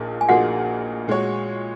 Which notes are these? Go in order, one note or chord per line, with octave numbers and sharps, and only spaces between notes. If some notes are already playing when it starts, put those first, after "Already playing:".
Already playing: A#1 A#2 A#3 D#4 G#4
G#5
A#1 A#2 A#3 D#4 F#4 G#4 F#5
A#2 G#3 F#4 C#5